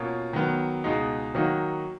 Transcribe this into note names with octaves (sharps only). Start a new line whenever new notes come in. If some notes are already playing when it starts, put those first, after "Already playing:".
Already playing: B2 A#3 C#4 F4
D#3 F#3 B3
C#2 B2 G#3 D#4
D#3 F#3 A#3 D#4 F#4